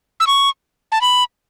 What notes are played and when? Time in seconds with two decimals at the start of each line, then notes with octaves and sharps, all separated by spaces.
0.20 E6
0.27 C#6
0.92 A5
1.01 B5